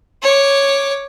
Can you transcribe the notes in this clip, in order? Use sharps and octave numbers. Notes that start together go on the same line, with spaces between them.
C#5 D6